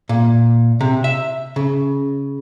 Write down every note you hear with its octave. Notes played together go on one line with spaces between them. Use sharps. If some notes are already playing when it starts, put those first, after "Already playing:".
A#2
C3
E5
C#3